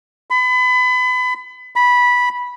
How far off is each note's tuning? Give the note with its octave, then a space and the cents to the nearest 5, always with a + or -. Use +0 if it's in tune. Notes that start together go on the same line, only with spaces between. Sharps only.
B5 +30
B5 -10